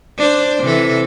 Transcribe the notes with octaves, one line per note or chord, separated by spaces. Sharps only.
D4 C5
C3 E3 A4